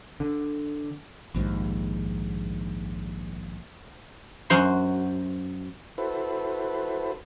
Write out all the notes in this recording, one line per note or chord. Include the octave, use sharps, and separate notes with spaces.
D3
A#1 D#2 G#2
F#2 F#4 C5 C6
E4 F#4 A4 B4 C5